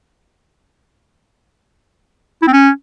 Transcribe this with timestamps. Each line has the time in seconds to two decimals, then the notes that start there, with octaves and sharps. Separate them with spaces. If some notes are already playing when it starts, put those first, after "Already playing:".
2.42 E4
2.48 C4
2.53 C#4